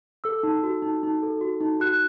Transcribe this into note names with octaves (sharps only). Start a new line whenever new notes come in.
A4 E6
D#4
F#4
D#4
D#4
A4
F#4
D#4
F#4 F#6